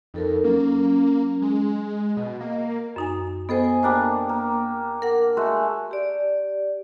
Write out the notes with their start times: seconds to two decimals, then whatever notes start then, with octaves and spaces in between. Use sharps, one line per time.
0.14 F2 D#4 A4 A#4
0.44 F#3 A#3 C#4
1.42 G#3
2.17 B2 D#5
2.41 A#3
2.96 F#2 D#4 G#5
3.49 B3 A4 C5 D#5 G#5
3.83 A#3 D4 G4 C5 B5
4.29 A#3
5.02 A#4 F#5
5.37 G#3 A3 F#4
5.91 G4 D5